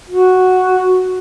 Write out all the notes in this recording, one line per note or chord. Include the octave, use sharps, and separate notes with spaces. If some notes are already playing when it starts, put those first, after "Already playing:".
F#4